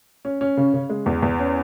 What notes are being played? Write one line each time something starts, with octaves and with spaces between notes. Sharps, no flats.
C#4
C#4
C#3
C#3
G#3
E2
E2
C#4